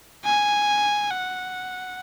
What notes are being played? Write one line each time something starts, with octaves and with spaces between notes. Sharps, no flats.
G#5
F#5